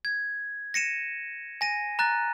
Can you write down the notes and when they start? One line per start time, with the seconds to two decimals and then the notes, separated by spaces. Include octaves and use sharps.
0.05 G#6
0.74 A#6 C#7 D#7 E7
1.61 G#5 A#6 D#7
1.99 A#5 F#6 A6